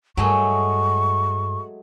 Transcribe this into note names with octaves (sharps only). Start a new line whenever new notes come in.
G2 F#3 G#3 A3 C#6